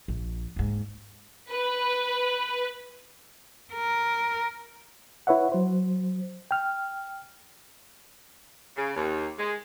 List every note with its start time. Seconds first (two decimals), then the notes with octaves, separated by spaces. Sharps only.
0.08 A#1
0.56 D#2 G#2
1.51 B4
3.74 A#4
5.27 E4 B4 C#5 E5 F#5
5.52 F#3 C5
6.51 G5 F6
8.77 C#3
8.96 D#2
9.38 G#3